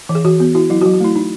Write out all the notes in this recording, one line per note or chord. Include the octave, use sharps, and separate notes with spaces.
E3
G#4
E3 F#4
B3 F#4
E4 F#4
F#3 E4
F#4
F#3
F#4
A3 E4
D#4